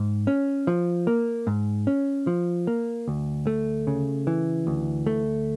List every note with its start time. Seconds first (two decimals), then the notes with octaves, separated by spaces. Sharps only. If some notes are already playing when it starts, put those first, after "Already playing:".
Already playing: G#2
0.27 C#4
0.67 F3
1.07 A#3
1.47 G#2
1.87 C#4
2.27 F3
2.67 A#3
3.08 D2
3.47 A3
3.87 C#3
4.27 E3
4.67 D2
5.06 A3